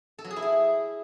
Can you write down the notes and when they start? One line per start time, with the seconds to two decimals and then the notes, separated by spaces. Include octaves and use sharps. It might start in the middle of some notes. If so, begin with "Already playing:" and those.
0.19 A4
0.24 F#3
0.30 G#4
0.36 E4
0.42 G#4